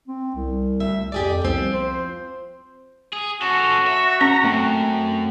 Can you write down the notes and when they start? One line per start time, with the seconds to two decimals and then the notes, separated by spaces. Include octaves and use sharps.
0.08 C4
0.35 C2
0.80 D2 E5
1.12 F2 G4 G#4 D5
1.42 C2 F3 C4
1.72 C5
3.13 G#4
3.42 C#4 F#4 A4
3.87 E5
4.21 C#4 A#5
4.44 F#2 A3 C4